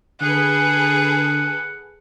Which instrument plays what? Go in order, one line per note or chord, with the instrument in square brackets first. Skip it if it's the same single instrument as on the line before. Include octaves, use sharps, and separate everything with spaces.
[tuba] D3 [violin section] G#4 A4 B4 [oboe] F#5